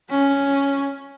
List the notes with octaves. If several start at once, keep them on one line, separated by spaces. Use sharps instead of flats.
C#4